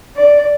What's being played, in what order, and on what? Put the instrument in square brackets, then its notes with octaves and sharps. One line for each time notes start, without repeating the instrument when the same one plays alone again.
[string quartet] D5